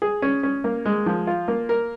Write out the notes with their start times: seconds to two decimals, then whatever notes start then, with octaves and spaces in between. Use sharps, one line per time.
0.02 G#4
0.22 C#4
0.43 C#4
0.64 A#3
0.85 G#3
1.06 F3
1.27 F4
1.48 A#3
1.69 A#4